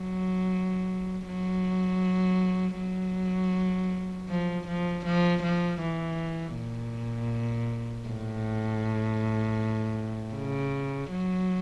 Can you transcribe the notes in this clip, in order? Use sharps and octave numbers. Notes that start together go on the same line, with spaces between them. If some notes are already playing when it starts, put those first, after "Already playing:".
Already playing: F#3
F#3
F#3
F3
F3
F3
F3
E3
A#2
A2
C#3
F#3